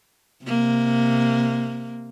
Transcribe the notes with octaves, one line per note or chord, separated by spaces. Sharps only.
C3 A#3